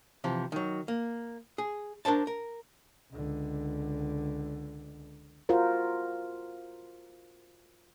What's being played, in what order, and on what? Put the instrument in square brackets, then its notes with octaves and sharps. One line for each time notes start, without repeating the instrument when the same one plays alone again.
[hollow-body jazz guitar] C3 E3 F3
D#3 F#3
A#3
G#4
D4 A#4 C5 A5
A#4
[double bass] C#2 D3
[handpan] F4 F#4 A#4 C5